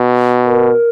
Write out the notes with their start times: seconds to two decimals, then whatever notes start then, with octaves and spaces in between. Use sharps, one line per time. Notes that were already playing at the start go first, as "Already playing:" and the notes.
Already playing: B2
0.45 A#4